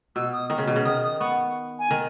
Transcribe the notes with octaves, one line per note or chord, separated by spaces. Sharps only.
B2 E6
D#6
D#3
C#3
B2
C#3
D#3 D#6
D#6
B3 C#6
G#5
D#3